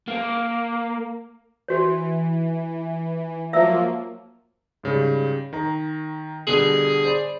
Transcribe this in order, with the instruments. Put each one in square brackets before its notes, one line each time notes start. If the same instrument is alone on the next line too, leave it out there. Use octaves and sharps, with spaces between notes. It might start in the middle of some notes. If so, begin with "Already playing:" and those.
[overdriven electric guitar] A#3
[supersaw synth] E3 [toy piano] F#4 C#5
[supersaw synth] F3 F#3 A#3 [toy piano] E5 E6
[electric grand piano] G#2 C#3 G3
D#3 A#5
[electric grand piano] B2 D3 G3 [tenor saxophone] G#4
[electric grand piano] C5 D5 B5